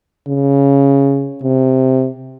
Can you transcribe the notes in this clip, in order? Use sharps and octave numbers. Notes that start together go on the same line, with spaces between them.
C#3
C3